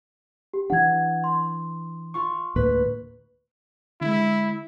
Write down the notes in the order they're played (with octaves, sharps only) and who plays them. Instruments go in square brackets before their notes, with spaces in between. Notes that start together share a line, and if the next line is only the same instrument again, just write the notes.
[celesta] G4
[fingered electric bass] E3 D4 [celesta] F#5 G#6
[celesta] C6
[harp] F4 C#6
[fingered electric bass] D2 A2 A#3 [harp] B4
[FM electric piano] D3 G#3 [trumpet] E4